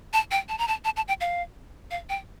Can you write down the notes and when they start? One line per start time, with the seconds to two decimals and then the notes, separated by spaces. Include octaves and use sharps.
0.13 A5
0.31 G5
0.49 A5
0.58 A#5
0.68 A5
0.85 A5
0.97 A5
1.08 G5
1.21 F5
1.91 F5
2.09 G5